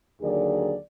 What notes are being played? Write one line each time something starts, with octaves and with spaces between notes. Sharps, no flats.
D#2 D3 F#3 G#4 A#4 D5